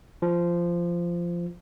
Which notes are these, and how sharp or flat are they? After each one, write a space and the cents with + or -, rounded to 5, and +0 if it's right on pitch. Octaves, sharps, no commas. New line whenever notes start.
F3 -15